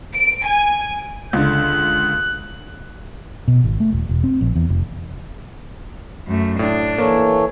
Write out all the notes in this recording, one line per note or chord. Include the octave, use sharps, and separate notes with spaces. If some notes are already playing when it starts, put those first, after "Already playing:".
D7
G#5
C#2 D3 F#6
B2
G#1
A3
D#1
E1
C4
A#1
E2
F1
F#2 A3
A2 D4
E3 A#3 A4 C#5